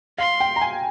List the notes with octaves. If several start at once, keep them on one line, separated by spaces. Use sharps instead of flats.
F5 C6
G5
A#5
G#5